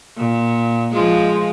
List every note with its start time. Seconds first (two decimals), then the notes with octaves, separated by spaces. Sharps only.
0.17 A#2
0.92 F3 G#3 F4